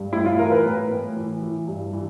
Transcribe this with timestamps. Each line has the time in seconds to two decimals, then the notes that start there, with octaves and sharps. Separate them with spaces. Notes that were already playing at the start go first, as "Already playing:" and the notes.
Already playing: G2
0.12 A2 E4
0.26 F4
0.39 E3 A#4
0.52 B4
0.65 A2
0.91 A2
1.17 E3
1.42 E3
1.68 G2
1.93 E3